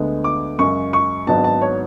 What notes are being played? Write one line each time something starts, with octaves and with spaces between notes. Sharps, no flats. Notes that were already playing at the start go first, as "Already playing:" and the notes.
Already playing: D2 D3 G#3 B3
D6
F#2 C#3 G#3 C#6
C#6
G#1 G#2 F#3 B3 D4 A5
A5
C#5